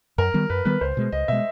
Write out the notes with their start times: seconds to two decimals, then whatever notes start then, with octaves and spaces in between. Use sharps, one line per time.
0.18 F#2 A#4
0.34 D#3 G3 B3
0.50 F#2 B4
0.65 D#3 G3 B3 B4
0.81 C#2 C5
0.97 B2 G#3
1.12 C#2 D#5
1.28 B2 G#3 E5